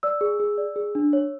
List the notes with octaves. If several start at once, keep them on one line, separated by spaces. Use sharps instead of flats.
D5 E6
G#4
G#4
D5
G#4
D4
C#5